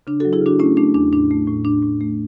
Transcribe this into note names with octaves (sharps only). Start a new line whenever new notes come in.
C#3 D4
F#4 A4
F#3
E4 G#4
C#3 D4 F#4
A3 C#4 E4
A3 D4
E2 D4
A2 D4
A3
A2
A2 D4
A2
A3